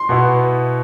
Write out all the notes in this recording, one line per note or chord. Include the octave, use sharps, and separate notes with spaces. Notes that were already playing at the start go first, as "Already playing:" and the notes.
Already playing: C6
B2 B3 E4